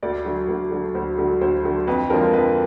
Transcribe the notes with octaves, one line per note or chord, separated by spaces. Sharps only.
D2 D5
D3 F#3
D2
D3 F#3
D2 C5
D3 F#3
D2 C5
D3 F#3
F2 B4
D3 F3 G#3 C4 A#4
F2 B4